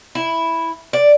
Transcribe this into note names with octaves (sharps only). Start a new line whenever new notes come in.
E4
D5